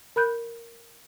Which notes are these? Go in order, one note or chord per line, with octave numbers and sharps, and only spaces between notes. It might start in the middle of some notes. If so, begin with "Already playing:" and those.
A#4 B5 F#6 G6